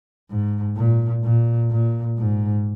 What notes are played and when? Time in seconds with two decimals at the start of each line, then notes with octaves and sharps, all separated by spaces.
0.30 G#2
0.77 A#2
1.24 A#2
1.71 A#2
2.18 G#2